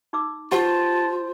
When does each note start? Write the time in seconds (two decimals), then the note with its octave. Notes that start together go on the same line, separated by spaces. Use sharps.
0.13 D#4 D6 E6
0.52 F4 G4 C5 F#5 A5